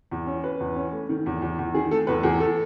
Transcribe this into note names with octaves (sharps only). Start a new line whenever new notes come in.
E2
C#4
C#4 B4
E2
C#4
A3
D#3
E2
E2
E2
D#3 G#4
A3 A4
E2 B4
E2 G#4
A4